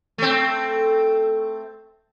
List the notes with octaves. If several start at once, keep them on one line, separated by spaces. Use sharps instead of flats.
A3 C4